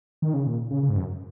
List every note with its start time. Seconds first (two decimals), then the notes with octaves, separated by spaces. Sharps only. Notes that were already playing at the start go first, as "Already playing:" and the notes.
0.22 D#3
0.34 C#3
0.46 A#2
0.71 C#3
0.83 C#3
0.89 G#2
0.96 F#2